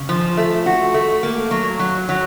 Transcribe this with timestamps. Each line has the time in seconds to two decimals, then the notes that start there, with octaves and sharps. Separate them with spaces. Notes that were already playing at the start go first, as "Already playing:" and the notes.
Already playing: C#3
0.09 F3
0.37 A3
0.66 F#4
0.94 A3
1.23 A#3
1.51 F#3
1.79 F#3
2.09 F#3